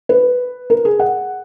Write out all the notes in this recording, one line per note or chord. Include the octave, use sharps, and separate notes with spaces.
B4
A#4
G#4
F#5